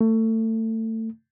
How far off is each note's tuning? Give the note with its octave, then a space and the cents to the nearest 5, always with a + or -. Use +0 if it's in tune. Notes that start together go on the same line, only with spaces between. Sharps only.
A3 +25